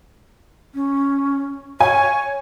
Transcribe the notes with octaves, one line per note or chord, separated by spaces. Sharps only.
C#4
C#5 G#5